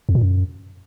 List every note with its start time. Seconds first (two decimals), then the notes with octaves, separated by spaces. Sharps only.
0.09 F2
0.15 A#2
0.21 F#2